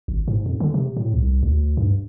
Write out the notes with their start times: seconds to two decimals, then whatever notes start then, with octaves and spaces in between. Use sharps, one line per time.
0.08 G#1
0.28 G#2
0.46 F2
0.60 D3
0.74 C3
0.97 A2
1.14 C2
1.43 D2
1.77 G2